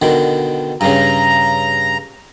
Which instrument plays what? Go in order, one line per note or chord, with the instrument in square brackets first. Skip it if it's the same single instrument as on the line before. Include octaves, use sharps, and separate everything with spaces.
[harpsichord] B2 D3 D#3
[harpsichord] G2 C#3 [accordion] A#5